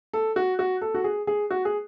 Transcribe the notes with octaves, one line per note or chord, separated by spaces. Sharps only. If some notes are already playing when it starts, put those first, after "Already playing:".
A4
F#4
F#4
A4
F#4
G#4
G#4
F#4
G#4